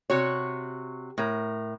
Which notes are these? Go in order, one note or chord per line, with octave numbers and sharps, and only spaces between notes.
C3 F#4 C#5
A2 A#4